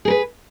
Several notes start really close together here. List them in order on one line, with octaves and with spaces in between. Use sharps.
G#4 A#4 B4